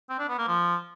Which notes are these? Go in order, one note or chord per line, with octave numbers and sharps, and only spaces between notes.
C4
D4
B3
A#3
F3